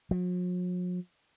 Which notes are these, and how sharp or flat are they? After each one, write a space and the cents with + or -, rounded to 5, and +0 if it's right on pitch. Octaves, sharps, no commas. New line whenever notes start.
F#3 -45